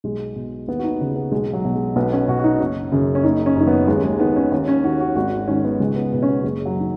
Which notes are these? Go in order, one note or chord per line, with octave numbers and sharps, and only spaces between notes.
B1 G#3
B2
D#2 B3
F#4
D#4
C#3
B3
B1 G#3
F#3
B2
G#3
B1 B3
C#4
B2 F#4
F#4
D#4
F#1 C#4
F#2 C#3
C#4
F#1 D#4
C#4
F#2 D#3
B3
D#2 G#3
G#3
D#3 B3
C#4
D#2 C#4
C#4
D#3 F#4
F#4
G#1 F#4
G#2 D#3 C#4
B3
C#2 G#3
B3
B2 B3
C#4
B3
F#1 G#3
F#3
D#3